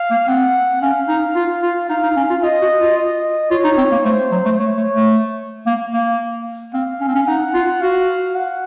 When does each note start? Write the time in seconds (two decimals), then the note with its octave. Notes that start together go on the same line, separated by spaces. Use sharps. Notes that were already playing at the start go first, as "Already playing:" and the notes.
Already playing: F5
0.10 A#3
0.28 C4 F#5
0.82 C#4 F5
1.08 D#4
1.35 F4
1.62 F4
1.89 D#4 F5
2.03 D#4
2.17 C#4
2.30 F4
2.43 F4 D#5
2.61 F#4
2.79 F4
2.97 D#5
3.51 F4 C#5
3.64 D#4
3.78 C4
3.92 A#3
4.05 A3 C5
4.32 F#3
4.45 A3
4.58 A3 C#5
4.77 A3
4.94 A3
5.66 A#3
5.93 A#3
6.74 C4 F5
7.01 C#4
7.08 C4
7.15 C#4
7.27 D#4 F#5
7.54 F4
7.81 F#4 F5
8.35 F#5